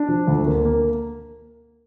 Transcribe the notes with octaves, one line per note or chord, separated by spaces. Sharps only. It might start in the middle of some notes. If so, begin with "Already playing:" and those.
Already playing: D4
F3
D2
A#3
A#3